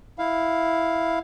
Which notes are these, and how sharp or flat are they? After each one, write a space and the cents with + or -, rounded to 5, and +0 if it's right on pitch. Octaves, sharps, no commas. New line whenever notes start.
E4 +0 F5 +0